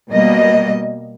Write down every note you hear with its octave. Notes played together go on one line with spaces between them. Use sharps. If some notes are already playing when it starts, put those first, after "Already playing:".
B2 G3 A#3 D#5